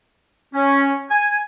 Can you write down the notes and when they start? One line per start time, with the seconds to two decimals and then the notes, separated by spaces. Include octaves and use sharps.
0.54 C#4
1.10 G#5